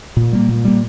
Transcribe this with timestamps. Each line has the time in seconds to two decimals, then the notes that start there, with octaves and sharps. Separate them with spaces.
0.17 A#2
0.33 G3 A#3
0.49 A#2
0.65 G3 A#3